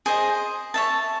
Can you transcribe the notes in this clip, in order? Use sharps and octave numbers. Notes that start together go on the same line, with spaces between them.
G#4 C5 D#5
C#5 E5 A5